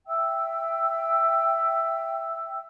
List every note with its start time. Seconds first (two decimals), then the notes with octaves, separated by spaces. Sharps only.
0.08 E5 G5 E6